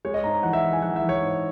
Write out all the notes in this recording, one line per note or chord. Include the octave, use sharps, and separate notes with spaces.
G#3 C#5
D#5
G#2 A#5
E3 F#5
E5
E3
G#5
E3 F#5
E5
E3
C#5
G#2